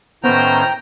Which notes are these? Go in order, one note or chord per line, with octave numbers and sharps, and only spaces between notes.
A2 D#3 B3 C#4 C5 G5 A#5